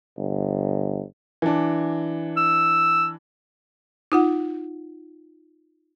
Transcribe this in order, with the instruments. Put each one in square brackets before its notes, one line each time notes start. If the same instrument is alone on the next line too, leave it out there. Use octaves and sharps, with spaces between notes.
[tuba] G1
[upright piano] E3 D4
[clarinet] E6
[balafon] D#4 F4 F#5